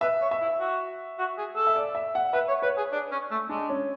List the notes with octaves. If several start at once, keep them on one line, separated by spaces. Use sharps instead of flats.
B4 E5
C#5
E5
E4
F#4
F#4
G#4
A4
E5
D5
E5
F#5
B4 E5
C#5
B4 C#5
G#4
D4
C#4
A3
G#3 D4
C#4